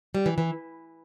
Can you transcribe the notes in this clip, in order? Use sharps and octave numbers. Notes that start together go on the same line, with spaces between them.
G3
E3
E3